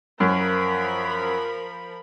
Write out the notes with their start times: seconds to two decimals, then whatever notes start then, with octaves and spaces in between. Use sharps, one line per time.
0.20 F#2 F3 A#4 B5